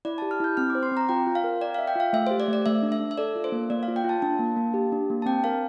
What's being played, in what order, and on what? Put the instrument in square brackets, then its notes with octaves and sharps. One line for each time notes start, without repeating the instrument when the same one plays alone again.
[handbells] E4 [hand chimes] D5
[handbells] G4 [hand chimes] A5
[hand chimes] F6
[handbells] E4 [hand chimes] G6
[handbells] C4 [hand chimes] F6
[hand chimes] D6
[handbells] C5
[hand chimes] C6
[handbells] C4
[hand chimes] A#5
[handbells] F4 [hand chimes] G5
[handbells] F4
[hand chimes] F5
[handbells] A#4
[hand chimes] D5 [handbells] G5
[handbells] E5 [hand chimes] F5
[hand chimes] G5
[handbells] F4 [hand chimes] F5
[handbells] A3 [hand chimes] E5
[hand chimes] C5
[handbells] G4
[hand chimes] D5
[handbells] A3
[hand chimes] D5
[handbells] A3 [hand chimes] E5
[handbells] D4
[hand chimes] E5
[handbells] D4
[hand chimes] E5
[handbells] A4 [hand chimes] D5
[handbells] F4
[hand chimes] C5
[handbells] A#3
[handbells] A#3 [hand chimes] D5
[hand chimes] F5
[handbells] F4
[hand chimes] G5
[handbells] F4 [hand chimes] A5
[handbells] D4 [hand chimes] A5
[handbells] A#3
A#3
G4
D4
A#3
[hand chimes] A5
[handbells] C4 [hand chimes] G5
[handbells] A#4 [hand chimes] F5